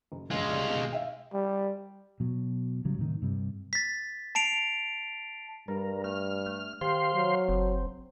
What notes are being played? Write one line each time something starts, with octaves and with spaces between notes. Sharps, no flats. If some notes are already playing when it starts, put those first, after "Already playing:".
F#1
A#1 F#2 G#3 F4
C2 D4
B2 D#3
E5 F5 G5
G3
B2 F#3
A1 C#3 F#3 G3
A2 C3 D#3
G2 C3 G3
A6 B6
A5 C7 D7 F7
G2 G3 A#4
A3 F6
A3
D#3 G4 C5 F5 C6
F#3
F#1 C4